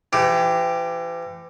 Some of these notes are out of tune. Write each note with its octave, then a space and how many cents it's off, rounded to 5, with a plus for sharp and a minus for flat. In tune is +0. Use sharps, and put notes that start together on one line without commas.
E3 +40 G4 +0